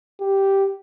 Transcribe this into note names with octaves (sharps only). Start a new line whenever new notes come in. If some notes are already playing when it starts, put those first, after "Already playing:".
G4